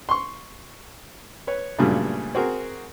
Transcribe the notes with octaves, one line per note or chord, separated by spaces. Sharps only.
C6 C#6
B4 C#5
G2 A#2 C#3 F#3 G3 A3
C4 F#4 G#4 A#4